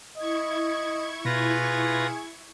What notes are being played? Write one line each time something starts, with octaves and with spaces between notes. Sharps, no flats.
E4 D#5 C#6 G#6
B2 F4 G#4 B4 A#6